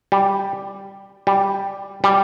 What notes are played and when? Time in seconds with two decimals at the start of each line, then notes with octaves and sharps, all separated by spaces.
0.12 G3
1.27 G3
2.04 G3